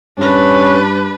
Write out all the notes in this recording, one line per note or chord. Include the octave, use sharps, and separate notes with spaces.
G2 C#4 D4 B4